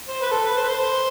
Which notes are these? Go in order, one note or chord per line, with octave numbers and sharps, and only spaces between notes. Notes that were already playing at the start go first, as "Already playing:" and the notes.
C5
B4
A4
B4
C5
B4
C5